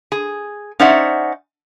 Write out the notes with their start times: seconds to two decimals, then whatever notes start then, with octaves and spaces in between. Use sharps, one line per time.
0.12 G#4
0.80 C#4 D#4 C5 D5 E5 F#5